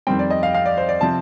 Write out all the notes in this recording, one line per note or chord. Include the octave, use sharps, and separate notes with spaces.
F2 D#3 G3 C4 G5
D5
D#5
F5
F5
D5
C5
D5
C3 F3 C4 A5